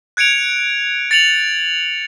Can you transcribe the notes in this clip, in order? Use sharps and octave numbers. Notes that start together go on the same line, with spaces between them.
F#6 G#6 C#7 D7 F7
A6 C#7 F7 F#7